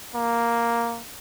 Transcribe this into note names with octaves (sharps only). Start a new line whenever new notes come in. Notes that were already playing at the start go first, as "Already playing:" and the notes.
A#3